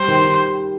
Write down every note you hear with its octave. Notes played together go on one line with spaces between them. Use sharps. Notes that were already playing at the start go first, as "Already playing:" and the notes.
Already playing: G3 C5
D#3
D#3